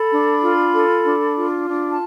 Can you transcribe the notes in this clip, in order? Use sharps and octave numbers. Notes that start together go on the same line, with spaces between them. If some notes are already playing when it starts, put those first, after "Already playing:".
Already playing: A4 B5
D4
F4
A4
D4
F4
D4
A5